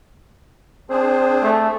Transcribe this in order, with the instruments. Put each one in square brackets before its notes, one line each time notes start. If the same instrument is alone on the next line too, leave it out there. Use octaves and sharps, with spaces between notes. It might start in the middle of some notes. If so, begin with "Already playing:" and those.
[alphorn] C4 [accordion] D4 G#4 C5
[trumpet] A3